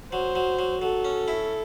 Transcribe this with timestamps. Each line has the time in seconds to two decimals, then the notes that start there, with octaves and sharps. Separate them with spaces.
0.12 F#3 C5
0.35 F#3
0.59 F#3
0.82 F#3 A4
1.05 C#4
1.28 E4